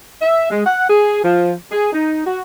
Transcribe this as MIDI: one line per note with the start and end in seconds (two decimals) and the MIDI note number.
0.22 0.47 76
0.51 0.65 56
0.65 0.85 78
0.89 1.23 68
1.24 1.53 53
1.72 1.90 68
1.93 2.21 63
2.27 2.41 66